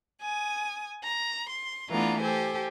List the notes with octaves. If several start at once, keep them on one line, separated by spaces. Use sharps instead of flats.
G#5 D#6
A#5
C6
E3 A3 B3 D4 F4 A#5
G4 A4 C5 G#5